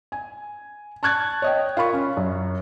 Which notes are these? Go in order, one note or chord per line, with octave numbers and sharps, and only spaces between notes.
G#5
A5 C#6 F#6 G#6 A6
C#5 D#5 G5
F4 A#4 B5 C#6
C#4
F#2